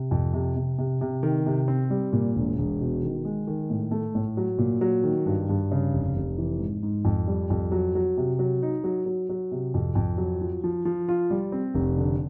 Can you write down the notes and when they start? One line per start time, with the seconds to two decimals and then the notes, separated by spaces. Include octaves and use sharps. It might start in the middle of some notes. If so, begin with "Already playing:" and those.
Already playing: C3
0.11 F2
0.33 C3
0.56 C3
0.78 C3
1.01 C3
1.23 D#3
1.46 C3
1.68 C4
1.90 G3
2.13 A#2
2.36 E1
2.58 E1
2.81 B2
3.03 D#3
3.25 G#3
3.47 D#3
3.70 A2
3.91 A3
4.15 A2
4.37 F#3
4.58 A#2
4.81 F#3
5.04 D#3
5.26 G2
5.49 G2
5.71 C#3
5.93 F1
6.16 F1
6.38 E3
6.60 G#2
6.83 G#2
7.05 F2
7.27 G3
7.50 F2
7.72 F#3
7.95 F#3
8.17 C3
8.39 F#3
8.62 D#4
8.84 F#3
9.06 F#3
9.29 F#3
9.52 C3
9.74 F2
9.95 F2
10.18 F#3
10.41 F3
10.64 F3
10.85 F3
11.08 F4
11.30 G3
11.52 C4
11.74 F1
11.97 D3